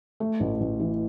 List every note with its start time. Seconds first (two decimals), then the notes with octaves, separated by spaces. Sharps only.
0.20 A3
0.40 A1
0.60 A1
0.80 E3